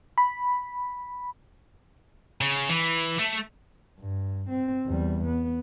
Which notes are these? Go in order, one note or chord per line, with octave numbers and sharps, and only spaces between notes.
B5
C#3
E3
A3
G2
C4
E2 G3
B3